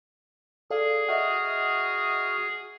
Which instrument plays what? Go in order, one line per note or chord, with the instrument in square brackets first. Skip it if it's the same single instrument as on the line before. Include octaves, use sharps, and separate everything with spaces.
[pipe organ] G#4 [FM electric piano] A4 D5 F5
[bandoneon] F#4 D#6 F6 [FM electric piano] D#5 E5 F#5